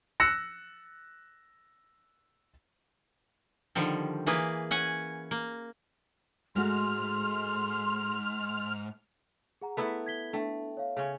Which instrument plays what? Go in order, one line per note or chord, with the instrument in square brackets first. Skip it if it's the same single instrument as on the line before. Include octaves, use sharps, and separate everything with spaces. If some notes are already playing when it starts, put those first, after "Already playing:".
[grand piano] E6 F#6 A#6 C#7
[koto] D3 D#3 F3 G3
E3 A#3 G#4 B4
C#4 F#5 G#5
A#3
[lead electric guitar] G#2 [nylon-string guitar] G#3 A3 F#4 [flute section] C6 [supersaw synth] F6
[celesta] G#4 F#5 A#5
[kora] A3 B3 E4
[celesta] G#6 B6 G7
[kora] A3 [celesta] D4 G5
[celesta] C#5 F5
[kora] C#3 C#4